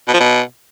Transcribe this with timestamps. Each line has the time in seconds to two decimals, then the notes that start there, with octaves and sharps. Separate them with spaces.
0.08 B2
0.14 F3
0.20 B2